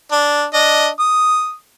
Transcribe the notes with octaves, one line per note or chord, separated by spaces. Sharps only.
D4
D4 D#5
D#6